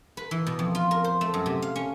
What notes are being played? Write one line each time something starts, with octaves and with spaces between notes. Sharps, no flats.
B4
E3
B2
F2
F4
A#4
C5
A3
F#2
C3
F5
C#4